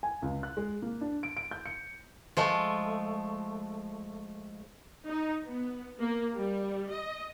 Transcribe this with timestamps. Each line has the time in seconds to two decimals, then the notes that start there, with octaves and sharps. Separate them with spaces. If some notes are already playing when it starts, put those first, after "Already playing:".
0.03 G#5
0.22 C#2
0.43 F#6
0.57 G#3
0.82 A#3
1.01 D4
1.23 D7
1.37 D7
1.51 G6
1.66 C#7
2.37 F3 G#3 A3
5.07 D#4
5.45 B3
5.99 A#3
6.36 G3
6.90 D#5